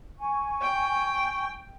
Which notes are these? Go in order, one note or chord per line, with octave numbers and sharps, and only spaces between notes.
G#5 C#6
G5